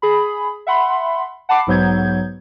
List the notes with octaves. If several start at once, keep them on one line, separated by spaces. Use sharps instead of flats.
G#4 B5
E5 F#5 B5 C6
F#5 A5 B5 D6 C7
B1 G#2 F#3 B3 G6 G#6